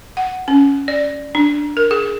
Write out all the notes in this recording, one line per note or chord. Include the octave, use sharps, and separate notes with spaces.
F#5
C#4
D5
D4
A#4
G#4